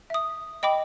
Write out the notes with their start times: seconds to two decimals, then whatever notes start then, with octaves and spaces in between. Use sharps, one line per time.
0.10 E5 D#6
0.63 D#5 G5 B5 D6